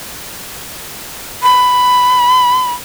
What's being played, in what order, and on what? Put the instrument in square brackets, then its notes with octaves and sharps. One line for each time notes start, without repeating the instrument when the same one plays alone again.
[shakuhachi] B5